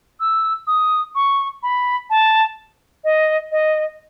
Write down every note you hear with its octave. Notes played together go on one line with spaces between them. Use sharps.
E6
D#6
C#6
B5
A5
D#5
D#5